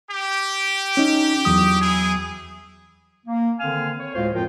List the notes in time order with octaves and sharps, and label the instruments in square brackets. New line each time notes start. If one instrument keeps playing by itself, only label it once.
[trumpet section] G4
[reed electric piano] C#4 D#4
E2 F#3 D#6
[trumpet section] E4 G#4
[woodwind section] A#3
D3 D#3 C4 F5 G#5 F6
C#5
D2 A2 G#3 F4 C5 F5
F2 A2 F3 F4 A#4 G5